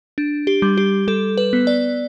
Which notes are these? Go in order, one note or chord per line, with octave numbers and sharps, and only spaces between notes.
D4
G4
G3
G4
G3 A4
B4
B3
D5